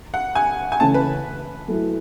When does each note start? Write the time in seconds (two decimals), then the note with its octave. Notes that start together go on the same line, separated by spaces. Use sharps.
0.14 F#5
0.35 G#5
0.72 G#5
0.80 C#3 E3 A3 C#4 E4 A5
0.94 B4
1.68 F#3 A3 E4